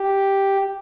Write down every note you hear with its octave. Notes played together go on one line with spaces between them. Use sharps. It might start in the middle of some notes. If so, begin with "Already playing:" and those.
Already playing: G4